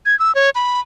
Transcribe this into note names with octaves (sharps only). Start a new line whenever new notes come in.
G#6
E6
C#5
B5